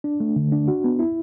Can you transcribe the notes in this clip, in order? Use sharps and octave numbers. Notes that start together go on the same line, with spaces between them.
D4
A3
D3
D4
F#4
B3
E4